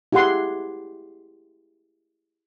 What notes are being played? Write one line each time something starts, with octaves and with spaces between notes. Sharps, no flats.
E4 G4 G#4 F#5 C6